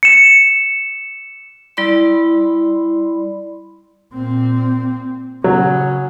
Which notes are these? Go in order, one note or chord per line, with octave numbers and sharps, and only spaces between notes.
C#7 E7
G3 E4 D5 B5 C6
A#2 C4
C#3 F#3